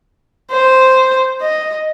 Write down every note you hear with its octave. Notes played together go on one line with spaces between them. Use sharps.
C5
D#5